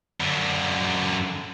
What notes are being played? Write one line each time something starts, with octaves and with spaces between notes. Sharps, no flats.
F#2 D3